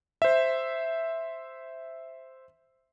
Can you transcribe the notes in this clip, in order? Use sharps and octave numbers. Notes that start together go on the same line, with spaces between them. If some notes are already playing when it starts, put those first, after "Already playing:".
C5 E5